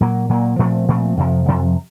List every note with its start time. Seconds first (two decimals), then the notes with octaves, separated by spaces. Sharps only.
0.01 A#2 F#3 A#3
0.29 A#2 F#3 A#3
0.59 A#2 F3 A3 C4
0.88 A#2 F3 A3 C4
1.17 F2 C3 F3
1.46 F2 C3 F3